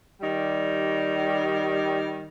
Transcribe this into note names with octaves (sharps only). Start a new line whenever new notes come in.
D#3 G3